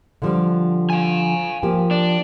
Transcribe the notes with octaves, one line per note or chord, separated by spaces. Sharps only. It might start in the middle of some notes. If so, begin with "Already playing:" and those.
D3 F3 G3
F5 G#5
F3 A#3 G4
D4